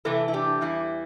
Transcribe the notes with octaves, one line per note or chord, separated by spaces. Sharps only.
C3 E3 A3 E4 A4
E4
D4 G4
E2 E3 G3 E4